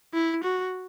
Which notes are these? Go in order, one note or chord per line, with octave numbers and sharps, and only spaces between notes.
E4
F#4